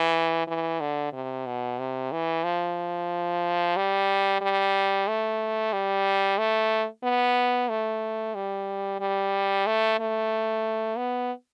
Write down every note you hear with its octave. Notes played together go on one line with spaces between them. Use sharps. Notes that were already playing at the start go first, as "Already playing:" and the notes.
Already playing: E3
E3
D3
C3
B2
C3
E3
F3
G3
G3
A3
G3
A3
B3
A3
G3
G3
A3
A3
B3